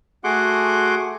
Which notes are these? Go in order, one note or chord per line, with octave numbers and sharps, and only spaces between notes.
A3 F#4 G#4 F#5 C6 D6